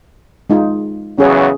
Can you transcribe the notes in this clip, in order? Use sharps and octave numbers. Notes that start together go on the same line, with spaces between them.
G#3 D#4 F4
E2 C#3 F#3 C#4 G#4 C#5